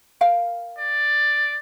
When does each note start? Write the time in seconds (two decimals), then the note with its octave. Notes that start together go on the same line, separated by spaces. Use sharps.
0.21 A#4 F5 G5
0.79 D5